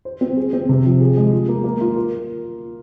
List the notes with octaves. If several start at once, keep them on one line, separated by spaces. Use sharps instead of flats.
C5
C4
G#4
C4
C3
F3
G#4
G#3
F4
A#3
A#3
F4
A#4